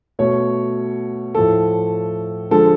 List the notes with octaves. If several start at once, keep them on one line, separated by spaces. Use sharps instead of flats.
B2 A3 C#5
A2 F3 A3 A4
D3 F3 G#3 A4